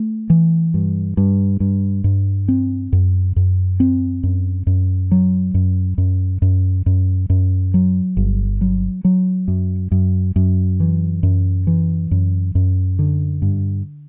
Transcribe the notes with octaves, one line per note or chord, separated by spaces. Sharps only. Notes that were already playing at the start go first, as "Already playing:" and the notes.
Already playing: A3
E3
G2
G2
G2
G2
C4
F#2
F#2
C4
F#2
F#2
F#3
F#2
F#2
F#2
F#2
F#2
F#3
G1
F#3
F#3
F#2
F#2
F#2
E3
F#2
E3
F#2
F#2
D3
G2